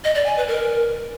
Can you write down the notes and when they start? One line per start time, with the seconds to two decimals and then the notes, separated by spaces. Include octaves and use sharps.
0.04 D#5
0.15 D5
0.26 G#5
0.37 B4
0.48 A#4